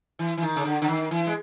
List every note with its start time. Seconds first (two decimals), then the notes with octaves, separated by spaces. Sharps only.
0.19 E3
0.37 E3
0.42 D#3
0.56 C#3
0.65 D3
0.82 D3
0.88 D#3
1.11 E3
1.27 G#3